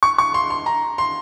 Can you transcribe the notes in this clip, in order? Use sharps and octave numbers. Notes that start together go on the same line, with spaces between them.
C#6
C#6
C6
C6
A#5
C6